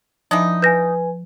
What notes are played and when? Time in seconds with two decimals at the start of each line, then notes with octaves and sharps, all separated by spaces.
0.31 E3 F3 D4 D#4
0.62 B4 G#5 G6 A#6